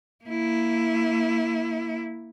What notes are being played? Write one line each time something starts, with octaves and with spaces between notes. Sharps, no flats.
A#3 E4